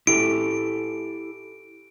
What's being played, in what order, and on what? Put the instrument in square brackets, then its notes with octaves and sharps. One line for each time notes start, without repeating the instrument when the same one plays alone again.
[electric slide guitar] E4 G4 A4 [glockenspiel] D7